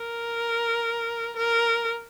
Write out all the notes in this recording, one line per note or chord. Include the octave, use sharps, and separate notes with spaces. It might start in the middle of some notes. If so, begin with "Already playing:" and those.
Already playing: A#4
A#4